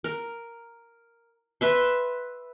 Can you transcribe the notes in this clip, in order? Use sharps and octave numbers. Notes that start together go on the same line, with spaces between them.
A#4
B4 E5 C6